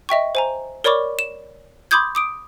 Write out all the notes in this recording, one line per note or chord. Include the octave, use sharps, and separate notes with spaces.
D#5 E5 G5 C#6
C5 G#5 A#5
A#4 C#5 D5 B5 C#6 D6
E7
B5 C6 D6 D#6 G6 G#6
D6 D#6 D7